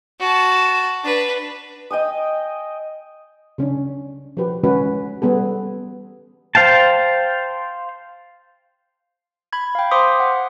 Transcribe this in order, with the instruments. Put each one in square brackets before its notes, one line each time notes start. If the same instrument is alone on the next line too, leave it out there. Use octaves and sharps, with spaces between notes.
[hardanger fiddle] F#4 A5
D4 B4
[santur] D#5 G5 G#5 D#6
[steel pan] C#3 C#4 D4
F3 F#4 G4 B4
D3 E3 G#3 C#4 F#4 B4
G3 B3 G#4 A4
[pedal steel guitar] C5 F5 G5 A5
[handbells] B5 G#6
F5 G5
C5 C6 D6 D#6 B6
F#5